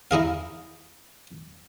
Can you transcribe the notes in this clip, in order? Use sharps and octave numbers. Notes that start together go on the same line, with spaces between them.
D#4 E4 G#4 F5